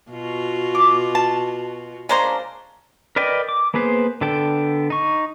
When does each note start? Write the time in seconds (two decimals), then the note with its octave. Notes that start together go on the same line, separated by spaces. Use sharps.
0.11 B2 F4 F#4
0.75 D6
1.15 A5
2.09 G#3 A#3 C#4 D4 C5 A#5
3.16 A#4 B4 D5 D#5 G5
3.49 D6
3.74 A#3 B3 G#4 B4 C5
4.21 D3 B3 A4 G5
4.90 D#4 C#6